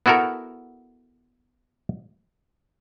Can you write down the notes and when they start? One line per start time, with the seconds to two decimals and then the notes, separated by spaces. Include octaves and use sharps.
0.06 B3 E4 F#4 A4 A#4